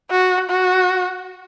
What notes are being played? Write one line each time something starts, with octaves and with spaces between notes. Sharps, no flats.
F#4
F#4